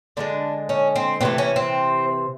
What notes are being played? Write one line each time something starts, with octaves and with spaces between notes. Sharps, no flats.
D3 F3 G#3 D4
C#4
C4
C3 E3 A3 C4
C#4
C4